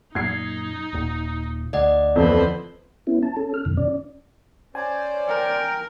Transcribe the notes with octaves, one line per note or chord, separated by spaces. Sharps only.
F#2 A#2 D#4 G#6 C7
D#1 A#2
D2 D5 D#5 F#5
F2 E3 F3 B4 C5
B3 C#4 E4
A5
C#4 A4
F6
F#2 B2 D#3
C#4 D5
C#4 C5 D5 G#5
A#4 G5